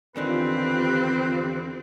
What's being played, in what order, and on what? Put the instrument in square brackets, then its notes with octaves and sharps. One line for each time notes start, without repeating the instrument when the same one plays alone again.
[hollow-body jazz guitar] E2 D3 D#3 [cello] C4 [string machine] F4 G4 [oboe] B4